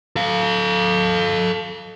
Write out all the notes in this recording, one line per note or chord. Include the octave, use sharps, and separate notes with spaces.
A4 F5